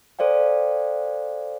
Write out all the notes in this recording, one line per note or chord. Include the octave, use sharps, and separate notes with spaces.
A4 C5 D5 F5 G5